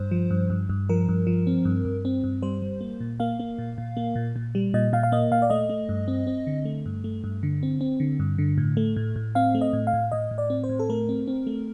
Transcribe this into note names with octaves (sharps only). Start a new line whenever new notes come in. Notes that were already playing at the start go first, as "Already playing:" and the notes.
Already playing: G2 C5
F3
G2
G2
G2
F3 A#4
G2
F3
C4
G2
G2
C4
G2
G3 C5
G3
A#3
A#2
A#3 F5
A#3
A#2
A#2
A#3
A#2
A#2
G3
A#2 D#5
A#2 F5
F5
A#3 D#5
A#2 F5
D5
A3 D#5
A3
G2
C4
C4
D3
A3
G2
A3
G2
D3
C4
C4
D3
G2
D3
A2
A3
A2
A2
C4 F5
A3
D#5
A2
F5
A2
A2 D#5
A2
D5
C4
C5
A2
A4
A3 A#4
C4
C4
A3